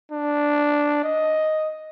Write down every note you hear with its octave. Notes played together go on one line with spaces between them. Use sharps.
D4
D#5